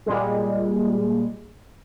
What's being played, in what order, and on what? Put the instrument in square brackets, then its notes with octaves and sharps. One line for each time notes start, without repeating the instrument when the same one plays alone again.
[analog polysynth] A#2 G3 G#3